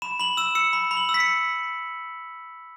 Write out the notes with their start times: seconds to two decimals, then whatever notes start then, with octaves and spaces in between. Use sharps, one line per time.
0.02 B5 E7
0.20 B5 F#7
0.37 E6 E7
0.55 E6 C#7
0.73 B5
0.91 B5
0.97 F#7
1.09 E6
1.14 B6
1.20 C#7